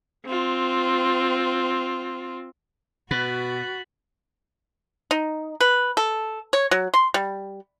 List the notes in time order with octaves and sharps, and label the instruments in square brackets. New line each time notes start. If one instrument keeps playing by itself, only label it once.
[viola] C4 F4
[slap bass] B2 [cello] F#4 [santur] B4 [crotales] A6 B6 F#7
[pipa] D#4
B4
A4
C#5
F#3
C6
G3